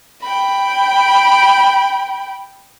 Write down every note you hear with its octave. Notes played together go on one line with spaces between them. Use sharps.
G5 B5